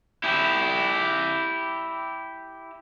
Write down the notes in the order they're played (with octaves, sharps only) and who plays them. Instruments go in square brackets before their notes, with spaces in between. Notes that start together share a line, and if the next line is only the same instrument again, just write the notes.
[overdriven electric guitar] E4 G4